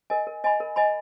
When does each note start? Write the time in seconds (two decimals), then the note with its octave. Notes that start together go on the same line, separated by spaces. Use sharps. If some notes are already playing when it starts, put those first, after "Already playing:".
0.10 A#4 D#5 G#5
0.27 A#4
0.44 D#5 G#5 B5
0.60 A#4
0.76 D#5 G#5 B5